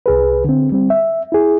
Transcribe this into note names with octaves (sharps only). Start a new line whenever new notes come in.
C2 G#4 B4
D3 C4
G3 C4
E5
E4 G#4